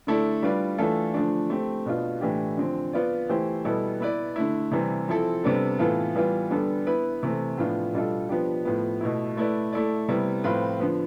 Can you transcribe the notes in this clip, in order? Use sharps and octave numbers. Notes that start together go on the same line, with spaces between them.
D3 A3 E4 A4 D5
G3 D4 F4 B4 D5
E3 A3 D4 F4 A4
D3 F3 A3 D4
A3 C4 G4
B2 B3 D4 F4
A2 E3 A3 D4 G4
D3 F3 C4
B3 F4 B4 D5
E3 A3 E4 G4 C5
B2 G3 B3 E4 A4
B3 E4 B4 D5
D3 A3 E4
C3 E3 G3
F3 C4 E4 A4
C3 G3 B3 D4 A4
A2 E3 B3 F4 A4
E3 G3 B3 F4
D3 G3 B3 D4 A4
B3 E4 B4
C3 E3 A3
A2 F3 B3 D4 F4
B2 G3 D4 F4 A4
F3 B3 D4 G4
A2 F3 B3
B2 A3 E4
A3 E4 B4 D5
A3 E4 A4 D5
C3 G3 B3 E4
A2 F3 C4 F4 B4
D3 F3 B3